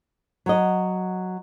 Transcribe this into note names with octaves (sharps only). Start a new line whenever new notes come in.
F#3 D#5